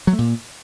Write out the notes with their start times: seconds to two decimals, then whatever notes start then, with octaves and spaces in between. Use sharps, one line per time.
0.07 F#3
0.13 A3
0.18 A#2